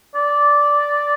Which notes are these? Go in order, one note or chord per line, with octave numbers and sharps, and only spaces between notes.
D5